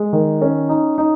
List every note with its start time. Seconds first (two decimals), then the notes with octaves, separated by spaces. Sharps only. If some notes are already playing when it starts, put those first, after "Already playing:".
Already playing: G#3
0.13 D#3
0.42 C#4
0.69 D#4
0.98 D#4